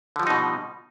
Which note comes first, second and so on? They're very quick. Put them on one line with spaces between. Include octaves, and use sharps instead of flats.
D3 F3 G3 D#4 B2